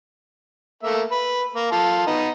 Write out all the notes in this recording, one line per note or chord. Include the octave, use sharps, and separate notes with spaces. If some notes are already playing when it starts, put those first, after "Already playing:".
A3 A#3 E5
B4
A#3
F4 A4
B3 D#4